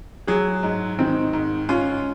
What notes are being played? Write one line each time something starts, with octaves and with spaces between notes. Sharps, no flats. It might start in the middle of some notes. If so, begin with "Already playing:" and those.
F#3 G#4
G#2
D#3 C4
G#2
C#4 F4